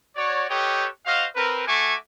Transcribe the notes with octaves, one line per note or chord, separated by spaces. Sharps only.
F#4 C#5 D5
G4 A4 B4 C#5 D#5 G5
F#4 C5 D#5 F5
C4 A#4 B4
A3 F#4 E5 G#5 C#6 D6